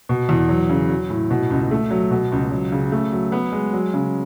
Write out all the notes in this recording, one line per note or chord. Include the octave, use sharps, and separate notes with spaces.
B2
E2
F#3
C#3
F#3
A2
B2
C#2
A3
F#3
B2
C#2
F#3
C#3
A3
F#3
B3
G#3
F#3
C#3